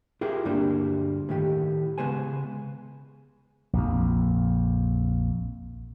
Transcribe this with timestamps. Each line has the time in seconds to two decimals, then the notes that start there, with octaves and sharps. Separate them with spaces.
0.21 E4 F4 G4 G#4 A#4
0.45 D2 G2 G3 A#3 C4 D4
1.29 A2 D#3 G4
1.98 C#3 G#3 B3 C5 G#5
3.73 A#1 F2